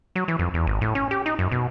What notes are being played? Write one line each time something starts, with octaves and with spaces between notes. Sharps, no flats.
F#3
E3
F2
E2
G#1
A2
C#4
G4
D#4
F#2
B2